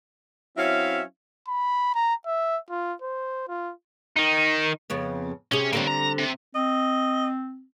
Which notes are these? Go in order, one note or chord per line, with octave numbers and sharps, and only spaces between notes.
F#3 C4 C#4 E4 E5 F5
B5
A#5
E5
F4
C5
F4
D#3 D#4
F2 C#3 B3
C3 C#4 G#4
D3 G3 A#3 C4 C#4
A#5
C3
C4 D#5